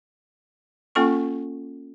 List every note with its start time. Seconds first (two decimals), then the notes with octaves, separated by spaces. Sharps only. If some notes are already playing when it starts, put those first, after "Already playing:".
0.95 A#3 C#4 F4 A4 G5 C#6